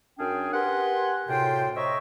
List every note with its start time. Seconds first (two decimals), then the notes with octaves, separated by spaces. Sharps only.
0.19 F#2 C#4 D4 G#4 F5 G5
0.54 G4 A#4 B4 F#5 G#5 C6
1.28 D2 A2 C3 F4 C5 G5
1.76 C5 C#5 D#5 E5 A#5 C#6